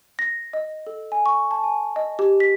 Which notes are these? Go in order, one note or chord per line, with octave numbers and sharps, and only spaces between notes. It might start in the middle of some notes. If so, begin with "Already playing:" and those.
A#6
D#5
A4
G#5
C#6
A5
G#5
D#5
G4
B6